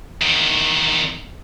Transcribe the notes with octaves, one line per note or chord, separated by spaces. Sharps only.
E2 D#3